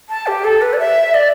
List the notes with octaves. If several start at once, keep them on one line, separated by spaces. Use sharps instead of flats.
A5
G4
A4
B4
D5
E5
D5